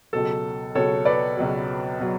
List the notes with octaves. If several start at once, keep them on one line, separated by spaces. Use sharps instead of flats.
C#2 B2 F#3 A4
C#2 B2 F#3 A4 C#5
B4 D5
C#2 B2 F#3
B2 F#3